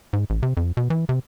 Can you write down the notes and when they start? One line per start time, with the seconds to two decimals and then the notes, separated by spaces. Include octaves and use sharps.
0.13 G#2
0.30 A1
0.43 C3
0.57 F2
0.77 B2
0.90 E3
1.09 C3